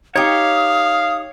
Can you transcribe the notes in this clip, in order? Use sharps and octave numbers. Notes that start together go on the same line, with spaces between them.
D#4 G4 C#5 F5 D#6